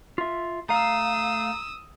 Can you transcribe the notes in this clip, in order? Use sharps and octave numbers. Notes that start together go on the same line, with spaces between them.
F4 E5
A3 F5 A#5 D#6 E6